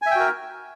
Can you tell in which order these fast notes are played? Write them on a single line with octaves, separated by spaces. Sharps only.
G#5 E5 G5 F#4 A#4